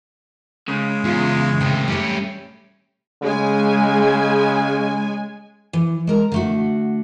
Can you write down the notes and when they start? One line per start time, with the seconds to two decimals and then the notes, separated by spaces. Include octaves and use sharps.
0.68 C#3 G#3
1.05 E2 F4
1.60 A2 C3 D#3 G5
1.88 G3 A3 C#4 G4
3.23 C#3 G#3 G#5
5.73 E3
6.07 G#3 A#4 A#5
6.32 D3 A3 F#4